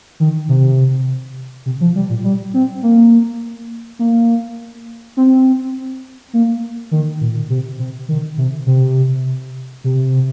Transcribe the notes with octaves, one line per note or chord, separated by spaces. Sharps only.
D#3
C3
C3
F3
G3
A#2
G3
C4
A#3
A#3
C4
A#3
D#3
A#2
C3
C3
D#3
C3
C3
C3